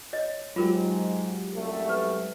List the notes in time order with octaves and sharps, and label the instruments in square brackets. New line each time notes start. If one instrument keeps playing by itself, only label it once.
[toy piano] C#5 D#5
[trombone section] G#2 [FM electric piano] F#3 G#3 G4 [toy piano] F4 A#4
[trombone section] C2 F#2 A3
[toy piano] B4